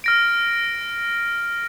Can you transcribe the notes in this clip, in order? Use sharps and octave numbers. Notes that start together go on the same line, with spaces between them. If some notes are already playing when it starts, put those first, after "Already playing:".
F6 A#6 D7